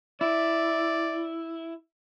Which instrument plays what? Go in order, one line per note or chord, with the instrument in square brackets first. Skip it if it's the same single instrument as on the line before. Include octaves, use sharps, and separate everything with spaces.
[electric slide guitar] E4 [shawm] D5